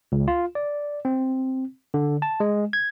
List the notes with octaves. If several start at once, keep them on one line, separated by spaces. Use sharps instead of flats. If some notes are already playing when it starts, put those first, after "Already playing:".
C#2
F4
D5
C4
D3
A5
G#3
G#6